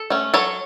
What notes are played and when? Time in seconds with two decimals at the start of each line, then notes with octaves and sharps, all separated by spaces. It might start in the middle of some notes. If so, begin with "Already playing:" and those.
Already playing: A4
0.10 A3 C#4
0.34 F#3 A4 C#5